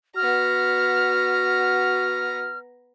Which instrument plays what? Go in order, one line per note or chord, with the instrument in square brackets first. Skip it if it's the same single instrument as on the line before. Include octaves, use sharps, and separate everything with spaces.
[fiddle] B3 A#5 [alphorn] F#4 [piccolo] F6